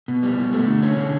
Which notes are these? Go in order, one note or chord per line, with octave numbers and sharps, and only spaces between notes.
B2
G3
B2
A3
D3
C#4
D3